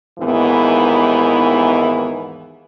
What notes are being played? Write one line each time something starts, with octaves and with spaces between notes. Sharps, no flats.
D#2 G#2 E3 B3